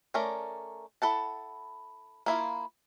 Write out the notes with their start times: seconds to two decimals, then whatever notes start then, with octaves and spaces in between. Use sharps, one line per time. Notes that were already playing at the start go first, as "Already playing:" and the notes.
0.14 A3 C#4 A#4 D5
1.02 E4 A4 F#5 A5
2.26 A#3 E4 F4